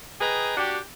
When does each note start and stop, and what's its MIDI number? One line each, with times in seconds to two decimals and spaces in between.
0.20 0.54 68
0.20 0.54 71
0.20 0.54 75
0.20 0.54 79
0.20 0.54 82
0.57 0.80 62
0.57 0.80 66
0.57 0.80 67